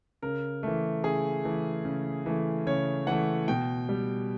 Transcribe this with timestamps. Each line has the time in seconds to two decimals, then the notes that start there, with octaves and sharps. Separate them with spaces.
0.22 C#3 A#4
0.63 E3 A3
1.03 C#3 G#4
1.45 E3 A3
1.85 C#3
2.26 E3 A3
2.66 C#3 C#5
3.07 E3 A3 F#5
3.48 B2 G5
3.89 G3